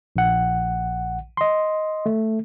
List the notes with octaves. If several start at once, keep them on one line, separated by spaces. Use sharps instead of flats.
A#1 F#5
D#5 C6
A3